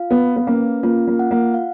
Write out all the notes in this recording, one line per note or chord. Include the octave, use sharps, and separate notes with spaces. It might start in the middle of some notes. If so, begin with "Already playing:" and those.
Already playing: F4 F5
B3 B4
B3
A#3 C#4
A#3 F4
A#3
F#5
A#3
F5